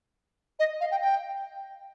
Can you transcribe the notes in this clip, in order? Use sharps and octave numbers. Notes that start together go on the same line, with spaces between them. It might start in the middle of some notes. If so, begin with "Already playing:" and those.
D#5
F5
G5
G5